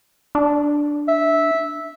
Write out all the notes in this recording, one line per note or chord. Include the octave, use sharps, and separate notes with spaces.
D4
E5